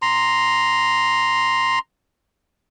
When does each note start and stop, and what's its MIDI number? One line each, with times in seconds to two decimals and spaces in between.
0.02 1.79 82
0.02 1.79 84